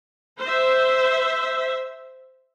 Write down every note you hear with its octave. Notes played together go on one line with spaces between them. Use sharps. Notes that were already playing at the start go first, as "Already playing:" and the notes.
C5 E5